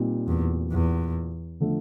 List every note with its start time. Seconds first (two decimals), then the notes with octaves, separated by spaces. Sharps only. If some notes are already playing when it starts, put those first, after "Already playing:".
Already playing: A#2 G3 C4 D#4
0.28 E2
0.72 E2
1.60 D3 F3 A3